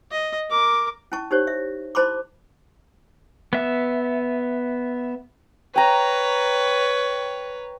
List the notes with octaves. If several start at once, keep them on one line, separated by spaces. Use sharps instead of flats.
D#5
A#4 D6
C#4 E4 A5 C#6
D#4 G4 C5 C#5
E5
E4 C5 A5 B5 C6 D6
B3 E5
B4 C#5 G5 A#5